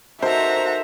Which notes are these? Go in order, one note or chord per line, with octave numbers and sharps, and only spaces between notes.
D#4 F#4 A4 A#4 C5 E5 A#5